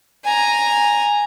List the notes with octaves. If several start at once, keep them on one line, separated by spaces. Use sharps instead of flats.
G#5 A#5